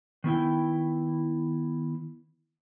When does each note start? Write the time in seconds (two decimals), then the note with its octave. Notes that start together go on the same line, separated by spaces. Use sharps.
0.24 D#3 B3 E4 G5